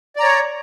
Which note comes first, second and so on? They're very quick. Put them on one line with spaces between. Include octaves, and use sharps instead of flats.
D5 A#5 C#5